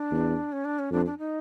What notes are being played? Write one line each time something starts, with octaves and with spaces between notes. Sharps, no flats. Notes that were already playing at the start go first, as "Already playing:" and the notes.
Already playing: D4
E2
C#4
D4
C#4
F2 D4
D4
D#4